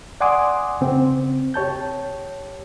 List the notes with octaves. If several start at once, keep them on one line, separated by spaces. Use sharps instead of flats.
D5 F#5 G#5 C6 D6 D#6
C#3 C4
G4 C#5 A5 G6